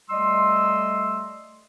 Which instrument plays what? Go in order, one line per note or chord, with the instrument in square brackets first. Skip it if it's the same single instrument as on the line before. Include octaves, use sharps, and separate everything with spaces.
[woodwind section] G3 A3 D#5 C6 E6